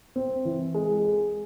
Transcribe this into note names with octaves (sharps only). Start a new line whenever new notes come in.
C4
E3
G#3
G#4